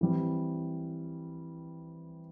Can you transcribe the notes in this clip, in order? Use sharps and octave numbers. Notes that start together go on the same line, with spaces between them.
E3 G3 C4